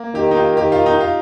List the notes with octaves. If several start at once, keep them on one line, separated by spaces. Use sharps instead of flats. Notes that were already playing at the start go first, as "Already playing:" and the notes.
Already playing: A#3
D#3 G4
D#4
F4
D#3 G4
F4
D#4
F4